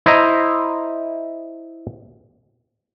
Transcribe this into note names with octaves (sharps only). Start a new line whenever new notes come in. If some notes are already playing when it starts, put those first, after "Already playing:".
E4 C5 D#5 A#5